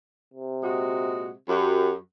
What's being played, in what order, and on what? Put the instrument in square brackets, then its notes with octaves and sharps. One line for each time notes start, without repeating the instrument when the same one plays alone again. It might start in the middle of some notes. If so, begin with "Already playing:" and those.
[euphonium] C3
[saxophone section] A#2 G#3 F#4
[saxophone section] F#2 F#4 [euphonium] G4